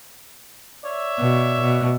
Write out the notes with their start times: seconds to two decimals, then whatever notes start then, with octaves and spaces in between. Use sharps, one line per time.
0.84 C#5 D5 E5
1.19 B2
1.61 B2